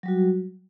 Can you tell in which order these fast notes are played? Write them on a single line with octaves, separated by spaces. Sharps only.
F#3 G3 F#4